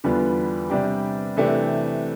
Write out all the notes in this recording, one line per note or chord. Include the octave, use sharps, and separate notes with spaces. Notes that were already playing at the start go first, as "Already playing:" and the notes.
E2 D3 G3 B3 F4
C3 G3 D4 G4
C3 E3 A3 D4 G4